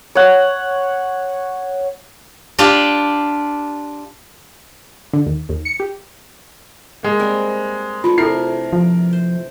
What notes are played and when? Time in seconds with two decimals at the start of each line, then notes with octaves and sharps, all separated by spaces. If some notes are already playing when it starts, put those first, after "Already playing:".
0.15 C#5 F#5
2.59 D4 F4 G4
5.13 D3
5.26 D#2
5.49 D#2
5.65 C#7
5.80 G4
7.03 G#3 A#3
7.19 G3 C4 A#4
8.04 E3 A3 D4 F4
8.18 C3 E4 A4 A#4 C7
8.73 F3
9.13 C5